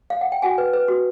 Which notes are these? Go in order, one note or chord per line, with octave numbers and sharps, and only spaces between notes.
F5
F#5
G5
F#4 F#5 G#5
B4
B4
F#4